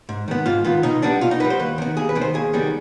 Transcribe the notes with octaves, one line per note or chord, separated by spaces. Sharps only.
G#2
D#3 B3
G#2 F4
D#3 B3 F4
B2 D#4
G3 B3 D4
B2 F4
D#4
G3 B3 B4
C5
D#2 B4
D#3 B3
D#2 G#4
B4
D#3 B3
C5
D#2 G#4
D#3 G3 B3